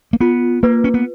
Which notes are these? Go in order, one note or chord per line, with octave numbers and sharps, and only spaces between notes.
A#3
B3 F4
A#3 B4
C#4
B3